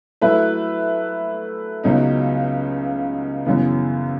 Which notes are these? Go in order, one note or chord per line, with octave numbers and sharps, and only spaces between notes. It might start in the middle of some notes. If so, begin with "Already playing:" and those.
F#3 A3 E4 B4 E5
C#2 C#3 F#3 B3 D#4
F#2 C#3 E3 B3